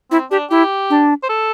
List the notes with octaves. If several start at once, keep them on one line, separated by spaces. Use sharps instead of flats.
C4 E4
D4 G4
E4 G4
D4
C5
A4